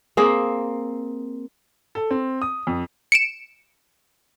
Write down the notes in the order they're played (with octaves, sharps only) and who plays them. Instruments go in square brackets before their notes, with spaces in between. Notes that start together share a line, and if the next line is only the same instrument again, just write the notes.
[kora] A#3 C4 G#4
[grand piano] A4
C4
D#6
F2
[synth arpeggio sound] C#7 D7 E7